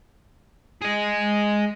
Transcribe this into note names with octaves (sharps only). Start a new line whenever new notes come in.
G#4 D#5